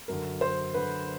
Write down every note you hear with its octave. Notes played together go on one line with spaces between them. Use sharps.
F#2 D3 A#4
C5
F#2 D3 B4